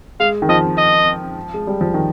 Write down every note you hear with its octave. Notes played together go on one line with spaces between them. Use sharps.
G#3 F5
D#3
F3 D#5
D#5
G#3
G3
F3
D#3